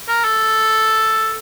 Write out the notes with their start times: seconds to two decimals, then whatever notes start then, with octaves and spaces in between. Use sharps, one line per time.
0.08 A#4
0.24 A4